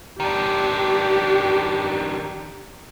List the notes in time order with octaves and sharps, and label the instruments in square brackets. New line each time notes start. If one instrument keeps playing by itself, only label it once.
[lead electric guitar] D#3 D4 [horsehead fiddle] G4